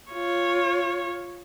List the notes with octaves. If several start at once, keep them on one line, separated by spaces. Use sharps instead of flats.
F4 C#5